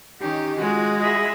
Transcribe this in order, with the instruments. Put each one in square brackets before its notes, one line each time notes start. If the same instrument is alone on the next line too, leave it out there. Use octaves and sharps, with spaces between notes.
[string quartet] D#3 C#4 D#4 [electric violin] G4
[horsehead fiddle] G#3 [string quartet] F4 [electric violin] F#4
[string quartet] G#4 E5 B5 [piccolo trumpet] D#5